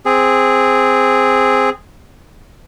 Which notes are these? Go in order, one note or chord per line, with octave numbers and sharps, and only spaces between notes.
C4 G#4